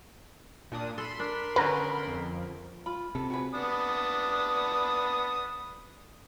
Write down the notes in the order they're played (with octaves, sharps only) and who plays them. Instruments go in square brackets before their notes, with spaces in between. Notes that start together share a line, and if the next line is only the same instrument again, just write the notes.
[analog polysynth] A#2 D4 D#6
[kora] A4 [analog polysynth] B5 C6
[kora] D4 [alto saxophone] A#4
[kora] D3 B3 C#4 [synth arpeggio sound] B4 A#5
[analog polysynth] F2
[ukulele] F4 B5
[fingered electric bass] C3 [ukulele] A4
[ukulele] F#4 G#4 B4
[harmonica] B3 D4 D#6